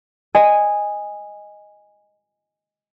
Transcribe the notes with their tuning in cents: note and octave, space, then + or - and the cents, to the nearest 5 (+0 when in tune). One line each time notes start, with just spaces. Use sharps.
D#5 +0 G#5 -10